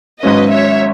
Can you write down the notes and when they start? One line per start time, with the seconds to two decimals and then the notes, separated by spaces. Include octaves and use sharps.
0.22 G#1 G#2 F#3 C#4 B4 D#5
0.51 C#5 E5